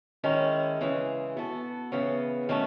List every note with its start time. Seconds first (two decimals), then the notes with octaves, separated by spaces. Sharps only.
0.24 D#3 G#3 C#4 E4
0.81 C#3 E3 G#3
1.37 B3 F#4 A4
1.92 C#3 E3 B3
2.49 D#3 F#3 A3 C#4